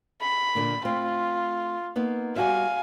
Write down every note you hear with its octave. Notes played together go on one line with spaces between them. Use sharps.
B5
A#2 D3 A#3
A3 C4 F4
A#3 B3 D#4
G3 F#4 E5 F5 G#5